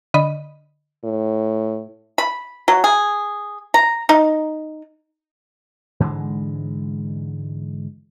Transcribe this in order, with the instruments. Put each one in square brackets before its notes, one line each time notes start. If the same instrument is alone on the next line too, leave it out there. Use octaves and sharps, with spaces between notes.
[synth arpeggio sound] D3 D#5 B5
[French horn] A2
[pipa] B5
F#3
G#4
A#5
D#4
[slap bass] G#2 D3 E3 G#3